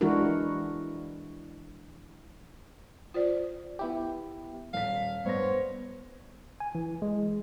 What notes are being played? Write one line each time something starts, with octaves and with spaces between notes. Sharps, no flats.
E3 G#3 D4 E4 F#4 A#4
F4 C5 D5
B3 E4 G4
D#1 F5 B6
G2 B3 C5 C#5 A#6
G#5
E3
G#3